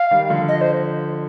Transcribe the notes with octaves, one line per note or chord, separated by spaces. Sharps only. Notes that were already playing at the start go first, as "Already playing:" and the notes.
Already playing: F5
D#3 G3
D3 F3
D#5
C5